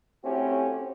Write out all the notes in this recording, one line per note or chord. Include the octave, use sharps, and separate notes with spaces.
A3 C4 C#4 E4 F#4 G4